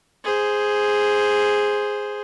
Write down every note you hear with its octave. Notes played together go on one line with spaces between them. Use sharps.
G#4 C5